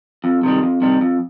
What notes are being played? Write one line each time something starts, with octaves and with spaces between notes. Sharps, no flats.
F2
C3 D#3 G3
F2
C3 D#3 G3
F2